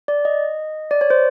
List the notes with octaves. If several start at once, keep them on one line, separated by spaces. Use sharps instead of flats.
D5
D#5
D5
C#5
C5